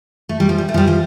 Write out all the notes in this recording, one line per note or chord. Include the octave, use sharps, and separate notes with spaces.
A3
G3
F3
G3
A3
F3
G3
F3